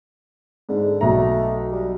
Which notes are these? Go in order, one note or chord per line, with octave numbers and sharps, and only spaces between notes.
G#2 D3
B1 A3 A#5
G3